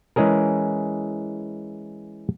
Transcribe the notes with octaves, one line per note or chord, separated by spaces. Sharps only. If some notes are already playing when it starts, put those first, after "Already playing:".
E3 G#3 C#4 G#4 A#4